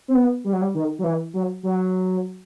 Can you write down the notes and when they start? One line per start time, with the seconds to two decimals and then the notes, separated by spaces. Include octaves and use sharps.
0.08 C4
0.15 B3
0.44 G3
0.53 F#3
0.61 G3
0.75 D#3
0.99 F#3
1.04 E3
1.34 F#3
1.63 F#3